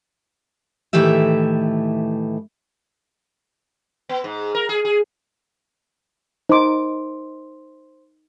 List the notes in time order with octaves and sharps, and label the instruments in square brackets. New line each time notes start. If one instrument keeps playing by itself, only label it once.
[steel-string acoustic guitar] A2 D#3 E3 A3 G4 E5
[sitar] B3
G#2
A#4
G#4
G#4
[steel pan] D#4 D6 [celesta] C5 C6